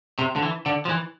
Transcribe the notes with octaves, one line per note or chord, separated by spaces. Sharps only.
C3
D3
E3
D3
F3
E3